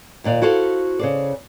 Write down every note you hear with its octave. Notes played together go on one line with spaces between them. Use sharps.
D#2 A#2 D5 F5
E4 F#4 A4 C5 F5
C#3 C5 D5